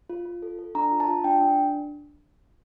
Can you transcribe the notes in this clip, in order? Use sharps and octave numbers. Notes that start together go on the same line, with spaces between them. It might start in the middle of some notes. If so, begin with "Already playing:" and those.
F4
F4
A4
A4
D4 A#5
F4
A5
F4
D4 G5
D4